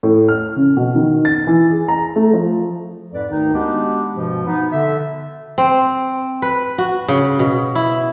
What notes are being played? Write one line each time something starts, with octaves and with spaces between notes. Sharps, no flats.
A2
F6
C#3
B2
D#3
A6
E3
G#4
A#5
A3
F3
F2 G#2 B4 D5
D2 D#3 D#4
G#3 B3 D4 F#4 G4
G2 B2 F3
B3 D#4
D3 E5
C4
B4
F#4
C#3
B2
E4